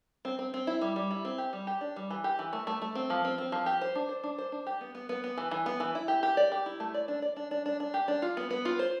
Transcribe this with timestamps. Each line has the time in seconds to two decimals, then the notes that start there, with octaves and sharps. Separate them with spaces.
0.25 C4
0.39 C4
0.54 C4
0.67 E4
0.81 G3
0.96 G3
1.11 E4
1.25 C4
1.38 G4
1.53 G3
1.67 G4
1.81 D4
1.96 G3
2.11 E3
2.24 G4
2.39 E3
2.53 A3
2.67 A3
2.82 A3
2.95 C4
3.10 F3
3.25 C4
3.38 C4
3.52 F3
3.66 G4
3.81 C5
3.95 D4
4.09 C5
4.23 D4
4.38 C5
4.52 D4
4.67 G4
4.81 B3
4.95 B3
5.09 B3
5.24 B3
5.38 E3
5.51 E3
5.66 B3
5.80 E3
5.95 E4
6.08 G4
6.23 G4
6.37 D5
6.52 G4
6.66 E4
6.80 A3
6.94 D5
7.08 D4
7.22 D5
7.36 D4
7.51 D4
7.66 D4
7.80 D4
7.94 G4
8.08 D4
8.22 F4
8.37 B3
8.51 B3
8.65 F4
8.79 C5